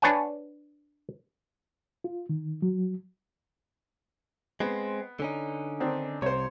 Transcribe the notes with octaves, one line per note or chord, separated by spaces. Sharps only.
D4 B4 C#5 F#5 G#5
F4
D#3
F#3
G#3 B3 C4
D3 C#4 D#4
D#3 C4 D4
C2 C3 C5 C#5